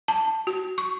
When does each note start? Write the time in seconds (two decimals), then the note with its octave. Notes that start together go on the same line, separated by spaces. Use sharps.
0.08 A5
0.47 F#4
0.78 C#6